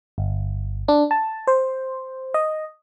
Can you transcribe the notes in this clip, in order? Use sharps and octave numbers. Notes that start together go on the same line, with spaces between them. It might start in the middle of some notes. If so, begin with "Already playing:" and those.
G1
D4
A5
C5
D#5